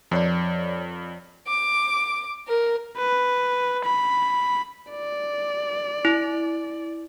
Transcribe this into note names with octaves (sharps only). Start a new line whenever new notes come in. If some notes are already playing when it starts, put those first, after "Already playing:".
F2 F3 C#5 D5
D6
A#4
B4
B5
D5
E4